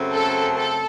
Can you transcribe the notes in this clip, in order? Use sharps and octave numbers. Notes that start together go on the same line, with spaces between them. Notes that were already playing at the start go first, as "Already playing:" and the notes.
Already playing: F#2 C#3 A3 C4
A4
A4